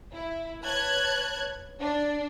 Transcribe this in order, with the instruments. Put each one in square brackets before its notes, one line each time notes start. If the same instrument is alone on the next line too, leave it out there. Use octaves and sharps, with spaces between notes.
[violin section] E4
B4 C#5 A5 F#6 G#6
D4